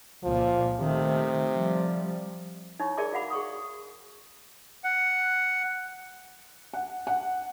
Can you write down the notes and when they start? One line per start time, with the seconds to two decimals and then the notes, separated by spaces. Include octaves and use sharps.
0.24 C#2 A#2 F3
0.80 C3 D#3 A3
1.53 F3 G3
2.80 D#4 E4 C#5 C#6
2.97 G#4 A#4 D5 E5 C6 D6
3.13 F#4 F5 F#5 B5 D6
3.30 G#4 C#6 D#6
4.84 F#5
6.73 F#5
7.07 F#5